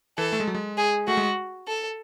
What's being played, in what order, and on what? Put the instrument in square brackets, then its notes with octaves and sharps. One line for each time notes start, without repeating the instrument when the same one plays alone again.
[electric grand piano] E3 [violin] A4
[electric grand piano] A3
G#3
F#3
G#3
[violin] G#4
[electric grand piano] A3 [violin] F#4
[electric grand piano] G#3
[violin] A4